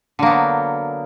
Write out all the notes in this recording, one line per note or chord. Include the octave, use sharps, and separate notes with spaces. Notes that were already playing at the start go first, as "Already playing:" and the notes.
D3 F#3 A#3 B3